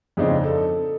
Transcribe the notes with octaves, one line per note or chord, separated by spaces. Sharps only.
F2 C#3 C4 D4 D#4
A4